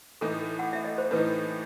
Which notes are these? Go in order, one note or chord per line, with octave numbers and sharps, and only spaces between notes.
A2 E3 A3 D#4 A4
F#5
E5
D#5
C5
A2 E3 A3 D#4 B4